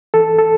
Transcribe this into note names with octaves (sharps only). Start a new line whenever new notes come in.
E3 A4
A4